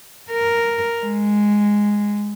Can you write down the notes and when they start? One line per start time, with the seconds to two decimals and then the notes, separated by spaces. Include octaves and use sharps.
0.31 A#4
1.03 G#3